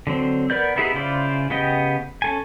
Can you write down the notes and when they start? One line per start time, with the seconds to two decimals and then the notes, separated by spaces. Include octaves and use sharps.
0.07 D3 F#3 C4
0.50 B3 A#4 B4 D5 G6
0.76 B3 D#4 E4 G4 G#4
0.94 C#3 E4 F4 C5 D5
1.50 C#3 B3 G4 D#5 G5
2.22 C#4 A4 G#5